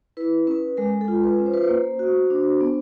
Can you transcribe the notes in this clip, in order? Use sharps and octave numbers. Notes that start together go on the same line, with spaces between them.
E4 B4
C#4 B4
G#3 A#4
A4
F4
B4
C#4
C5
B4
C5
A#3
F#4
D4
B3